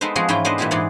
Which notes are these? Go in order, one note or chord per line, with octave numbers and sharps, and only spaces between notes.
G#3 B3 D#4 A4 B4 C5
F3 G#3 C4 F#4 G#4
G#2 E3 C#4 E4 F4 G5
G#3 B3 D4 B4 C5 D#5
A#2 E3 G3 E4 F4 G4
G#2 E3 D#4 G#4 D5 F#5